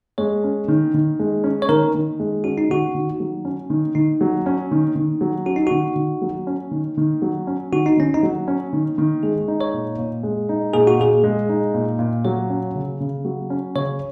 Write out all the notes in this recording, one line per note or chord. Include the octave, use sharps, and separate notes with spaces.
G#3 C#5
C#4
D#3
D#3
G#3
C#4
C#5
D#3 A#4
D#3
G#3
C#4 F#4
D#4
D#3 F#4
D#3
F#3
C#4
D#3
D#3 D#4
F#3
C#4
D#3
D#3
F#3
C#4 F#4
D#4
D#3 F#4
D#3
F#3
C#4
D#3
D#3
F#3
C#4
D#3 F#4
D#4
D#3 C#4
D#4
F#3
C#4
D#3
D#3
G#3 G#4
D#4
C#5
A#2
A#2
G#3
D#4
A#2 G#4
F#4
A#2 G#4
G#3
D#4
A#2
A#2
F#3 C#5
C#4
C#3
C#3
F#3
C#4
C#3 C#5